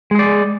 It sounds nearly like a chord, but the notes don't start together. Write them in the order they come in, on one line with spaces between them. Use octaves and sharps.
G#3 G#4 D5